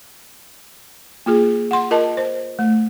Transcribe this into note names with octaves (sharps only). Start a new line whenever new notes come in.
A#3 F4 G#4
F#5 C6
F4 A#4 D#5 A5
C5
A3